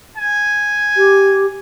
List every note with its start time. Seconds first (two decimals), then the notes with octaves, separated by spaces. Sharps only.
0.17 G#5
0.97 G4